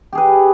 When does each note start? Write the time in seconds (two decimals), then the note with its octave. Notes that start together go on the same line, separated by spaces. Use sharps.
0.13 G4
0.15 G#4
0.18 B4